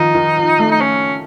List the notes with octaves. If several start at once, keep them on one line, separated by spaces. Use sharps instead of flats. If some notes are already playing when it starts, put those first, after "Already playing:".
Already playing: D#3 F3 D#4
D#3
F3
A3
D#4
C#4